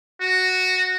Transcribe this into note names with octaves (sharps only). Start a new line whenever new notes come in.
F#4